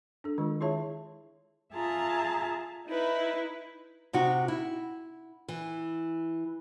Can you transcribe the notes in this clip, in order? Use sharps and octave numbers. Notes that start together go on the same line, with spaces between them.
D4 A4
D#3 G#3 F4
E4 F4 G#4 C#5 E5 A5
F4 G#4 E5 A5 A#5
D#4 E4 B4
C3 D#4 F#4
E4
E3